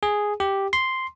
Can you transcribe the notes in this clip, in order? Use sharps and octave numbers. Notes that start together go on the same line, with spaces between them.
G#4
G4
C6